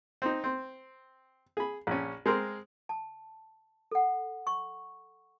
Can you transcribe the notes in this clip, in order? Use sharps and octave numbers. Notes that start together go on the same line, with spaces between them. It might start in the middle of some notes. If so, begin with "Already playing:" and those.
C4 D#4
C4
G#4 B5
A#1 C#4
G#3 C4 A#4
A5
A4 F#5
C#6